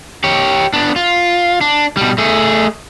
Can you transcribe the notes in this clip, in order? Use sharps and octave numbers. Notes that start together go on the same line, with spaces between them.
G4 C#5
B3 D4
F4
D4
B2 G3
A3 G#4